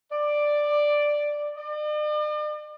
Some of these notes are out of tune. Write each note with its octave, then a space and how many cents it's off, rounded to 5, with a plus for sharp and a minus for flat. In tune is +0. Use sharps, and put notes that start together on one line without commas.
D5 +5
D5 +45